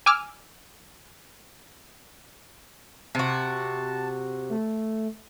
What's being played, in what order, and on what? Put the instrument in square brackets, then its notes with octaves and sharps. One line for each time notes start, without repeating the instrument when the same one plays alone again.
[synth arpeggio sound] G#5 D6 E6 F6
[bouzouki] C3 F#4 [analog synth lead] A5
[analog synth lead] A3